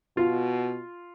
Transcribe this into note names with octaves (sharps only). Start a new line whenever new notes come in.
B2 F4